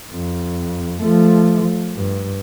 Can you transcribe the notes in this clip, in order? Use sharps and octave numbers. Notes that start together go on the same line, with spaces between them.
F2
F3 A3
G2